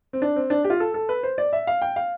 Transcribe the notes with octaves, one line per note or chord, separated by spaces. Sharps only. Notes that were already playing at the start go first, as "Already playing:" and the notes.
C4
D4
C4
D4
G4
F4
A4
A4
B4
C5
D5
E5
F5
G5
F5